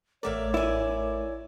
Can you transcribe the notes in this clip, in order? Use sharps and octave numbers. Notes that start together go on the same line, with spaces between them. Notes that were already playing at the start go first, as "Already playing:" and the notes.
A1 A3 A#4 C#5 D5 E5 F5
E4 D5 G#5